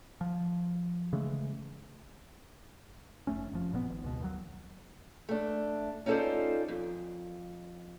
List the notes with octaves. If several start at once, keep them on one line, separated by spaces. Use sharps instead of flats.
F3
C#3 E3 G#3 A3
F1 A3 C#4
F1 A2 F3
G#1 A#2 D#3 B3
G#1
C#2 B2
D#2 F#3
A3 D4
C#4 D#4 F4 A4 C5 D5
F2